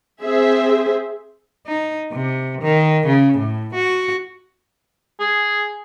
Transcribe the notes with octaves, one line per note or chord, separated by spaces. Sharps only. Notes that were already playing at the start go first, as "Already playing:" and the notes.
C4 G#4 C5 E5
D#4
C3
D#3
C#3
A2
F#4
G#4